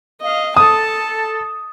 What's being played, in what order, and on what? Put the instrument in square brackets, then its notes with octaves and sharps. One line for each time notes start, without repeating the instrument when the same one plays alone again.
[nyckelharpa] D#5 [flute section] F5
[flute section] A4 [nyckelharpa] A5 [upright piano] D#6